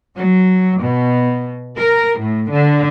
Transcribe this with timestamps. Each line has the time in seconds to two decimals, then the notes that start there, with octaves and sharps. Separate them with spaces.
0.17 F#3
0.81 B2
1.78 A#4
2.18 A2
2.51 D3